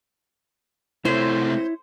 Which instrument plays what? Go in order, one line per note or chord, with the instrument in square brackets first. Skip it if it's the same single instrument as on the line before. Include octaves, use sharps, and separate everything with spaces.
[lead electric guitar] C3 A3 [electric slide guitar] E4 C#5 [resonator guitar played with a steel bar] C5